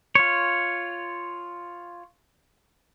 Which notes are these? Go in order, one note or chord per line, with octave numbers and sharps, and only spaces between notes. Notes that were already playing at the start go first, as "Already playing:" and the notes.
F4 C#5